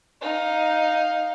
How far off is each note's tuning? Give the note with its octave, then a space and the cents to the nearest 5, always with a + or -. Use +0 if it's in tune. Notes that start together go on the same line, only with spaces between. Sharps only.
D#4 +0 F5 +10